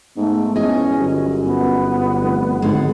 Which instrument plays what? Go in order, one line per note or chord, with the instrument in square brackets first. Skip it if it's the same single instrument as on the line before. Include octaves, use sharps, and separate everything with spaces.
[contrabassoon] G#2 [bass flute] A3 [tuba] B3
[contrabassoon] E2 [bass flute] C#4 [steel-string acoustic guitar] G#4 D#5 G#5
[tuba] G1 [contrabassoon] F#2
[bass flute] B3
[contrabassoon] F1
[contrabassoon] G#1 [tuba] G#2 [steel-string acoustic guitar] D3 G#3